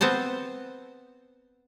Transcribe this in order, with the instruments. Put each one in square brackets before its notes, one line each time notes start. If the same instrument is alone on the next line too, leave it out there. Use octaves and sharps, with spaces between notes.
[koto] B3 C4 C5 A5